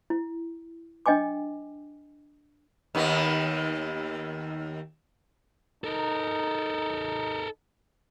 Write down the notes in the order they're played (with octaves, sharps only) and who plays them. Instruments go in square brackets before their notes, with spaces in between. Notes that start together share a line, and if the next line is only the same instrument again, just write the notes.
[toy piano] E4
D4 D#5 G5 G#5 D6
[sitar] D#2 D#3 B3
[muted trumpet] D#4 [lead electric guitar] A4 A#4